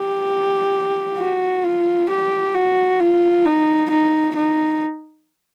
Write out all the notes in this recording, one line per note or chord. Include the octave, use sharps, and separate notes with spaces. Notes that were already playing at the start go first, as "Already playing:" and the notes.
Already playing: G4
F#4
F4
G4
F#4
F4
D#4
D#4
D#4